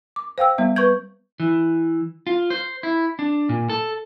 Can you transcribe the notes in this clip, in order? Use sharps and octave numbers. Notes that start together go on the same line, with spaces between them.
D6
C5 F5 G5 E6
G3 B3 E5
B4 C#6 G6 G#6
E3
F4
C5
E4
D4
A#2
A4